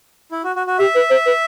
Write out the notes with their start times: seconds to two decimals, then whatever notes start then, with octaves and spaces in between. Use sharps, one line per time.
0.32 E4
0.44 F#4
0.56 F#4
0.67 F#4
0.79 G4 E5
0.94 B4
1.09 C5
1.25 B4